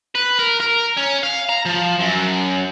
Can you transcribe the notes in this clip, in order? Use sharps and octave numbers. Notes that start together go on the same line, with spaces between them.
B4
A#4
A#4
C#4
F5
A#5
F3
F#2